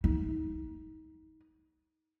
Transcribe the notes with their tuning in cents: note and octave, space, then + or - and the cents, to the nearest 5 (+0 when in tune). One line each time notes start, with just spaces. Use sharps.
D#4 +25